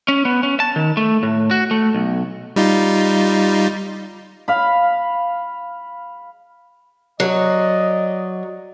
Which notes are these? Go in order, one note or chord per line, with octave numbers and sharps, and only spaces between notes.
C#4
B3
C#4
A5
D#3
A3
A2
F#4
A3
B1
G3 D#4 F4
F5 B5
F#3 D5 D#5